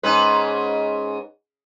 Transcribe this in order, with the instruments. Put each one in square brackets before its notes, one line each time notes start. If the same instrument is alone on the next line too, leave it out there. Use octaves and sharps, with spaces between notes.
[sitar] G#2 C#4 B4